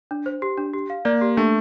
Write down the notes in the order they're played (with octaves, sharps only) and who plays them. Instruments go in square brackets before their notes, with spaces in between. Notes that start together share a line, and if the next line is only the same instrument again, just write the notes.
[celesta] D4
C5
G4
D4
G4
F5
[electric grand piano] A#3 [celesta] D5
[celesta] G4
[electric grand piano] A3 [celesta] D4